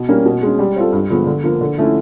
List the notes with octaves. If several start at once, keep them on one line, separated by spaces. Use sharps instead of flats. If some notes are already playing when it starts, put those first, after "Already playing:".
Already playing: B2
G3 A#3 C#4
B2
G#3 C#4
G3
C4 F4 A4
G2
D3 F3 G#3 B3
D3
F3 A#3
D3
F3 A3 C#4 E4